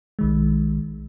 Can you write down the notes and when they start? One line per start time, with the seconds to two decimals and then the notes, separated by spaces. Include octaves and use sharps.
0.19 B1 D#3 G#3